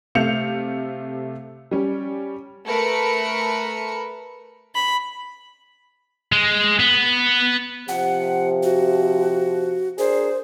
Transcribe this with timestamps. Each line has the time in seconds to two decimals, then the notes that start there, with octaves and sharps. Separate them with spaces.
0.15 C3 A3 F5 G6 C#7 F7
1.71 G3 C#4
2.68 A3 A#4 B4 B5 C#7
4.74 B5
6.32 G#3
6.80 B3
7.89 C3 F3 F#5
8.63 F#4
9.99 D4 G#4 A#4 C5